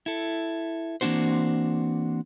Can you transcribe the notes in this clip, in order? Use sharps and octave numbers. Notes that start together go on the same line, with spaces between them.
E4 A4
E3 A#3 C4 D4 F#4 C5